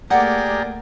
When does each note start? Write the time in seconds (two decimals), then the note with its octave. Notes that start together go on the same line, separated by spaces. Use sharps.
0.10 A3 A#3 G4 G#4 A#4 D5 F#5